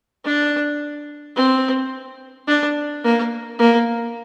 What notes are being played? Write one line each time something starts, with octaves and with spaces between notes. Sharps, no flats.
D4
C4
D4
A#3
A#3